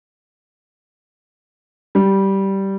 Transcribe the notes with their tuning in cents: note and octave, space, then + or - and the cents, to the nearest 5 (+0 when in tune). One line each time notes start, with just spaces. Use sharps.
G3 -10